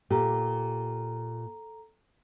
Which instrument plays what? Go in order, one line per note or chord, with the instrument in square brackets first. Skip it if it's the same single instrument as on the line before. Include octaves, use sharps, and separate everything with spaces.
[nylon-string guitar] A#2 G4 [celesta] A4 A#5